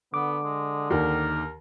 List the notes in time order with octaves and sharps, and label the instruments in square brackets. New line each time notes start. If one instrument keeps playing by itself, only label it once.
[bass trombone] D3 [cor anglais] B3 [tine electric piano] D6
[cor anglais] G#3
[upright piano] D#2 D#3 [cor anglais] A#4